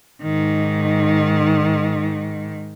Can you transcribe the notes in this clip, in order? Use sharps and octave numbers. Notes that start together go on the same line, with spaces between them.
G#2 D#3